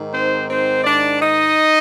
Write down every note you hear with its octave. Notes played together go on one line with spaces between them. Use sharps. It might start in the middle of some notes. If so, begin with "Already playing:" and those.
Already playing: G#2 D#3
C4 C5
C4 C5
D4 D5
D#4 D#5